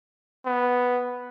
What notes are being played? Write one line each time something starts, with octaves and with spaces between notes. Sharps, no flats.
B3